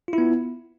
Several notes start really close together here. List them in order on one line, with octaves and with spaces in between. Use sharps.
F4 E4 B3